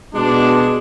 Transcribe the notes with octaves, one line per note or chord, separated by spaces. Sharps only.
B2 G#3 D4